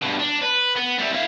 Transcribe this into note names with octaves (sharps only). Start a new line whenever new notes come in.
G2 B2
D4
B4
B3
G3 E4
E4 F5